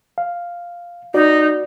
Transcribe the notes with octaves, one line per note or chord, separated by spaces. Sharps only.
F5
D#4 F#4 D5